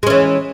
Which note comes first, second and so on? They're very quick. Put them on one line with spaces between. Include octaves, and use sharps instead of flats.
G#3 C#4 E3